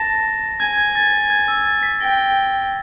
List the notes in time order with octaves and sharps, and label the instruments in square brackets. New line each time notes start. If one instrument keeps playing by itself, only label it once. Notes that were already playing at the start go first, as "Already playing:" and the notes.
Already playing: [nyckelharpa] A5 [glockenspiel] A#6
[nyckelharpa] G#5 [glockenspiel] G#6
[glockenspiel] G#6
A6
G#6
E6
A6
B6
[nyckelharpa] G5 [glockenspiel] A#6